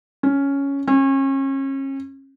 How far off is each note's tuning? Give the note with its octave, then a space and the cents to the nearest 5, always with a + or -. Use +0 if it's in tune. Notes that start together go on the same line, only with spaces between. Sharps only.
C#4 +5
C#4 -35